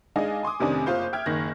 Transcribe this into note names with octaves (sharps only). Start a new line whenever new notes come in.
G#3 D4 D#4 D#5 F5 G#5
G#5 C6 D6 D#6
F1 C3 D#3 C#4 D4 G#5
F#1 F4 C5 G6
E5 G5 F6 G#6
F#1 D#3 A#6